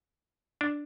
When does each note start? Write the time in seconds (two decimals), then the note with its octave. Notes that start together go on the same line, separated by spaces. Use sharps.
0.61 D4